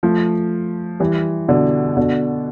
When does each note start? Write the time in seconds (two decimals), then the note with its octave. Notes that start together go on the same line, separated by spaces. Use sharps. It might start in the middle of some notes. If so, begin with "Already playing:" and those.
0.03 F3 A3
1.00 E3 G3
1.48 B2 D3
1.97 B2 D3